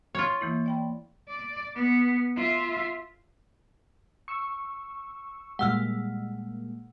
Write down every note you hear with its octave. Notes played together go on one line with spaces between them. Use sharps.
F4 C#5
E3 A#3 E4
D5 G5 B5
D5
B3
F4 E5
C#6 E6
A#2 G3 G#3 F#5 E6 F6